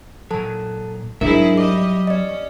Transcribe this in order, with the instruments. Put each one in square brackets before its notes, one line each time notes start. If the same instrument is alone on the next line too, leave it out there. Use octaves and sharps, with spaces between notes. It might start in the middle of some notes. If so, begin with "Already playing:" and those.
[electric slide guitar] A#2 F#3 [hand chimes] A4 A5
[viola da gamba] G#2 E4 G#4 [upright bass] F#3 [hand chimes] D4 A#4 [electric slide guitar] F#4 E5
[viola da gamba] G3 D#5 [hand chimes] D6
[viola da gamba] C#4 [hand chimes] D5 D#5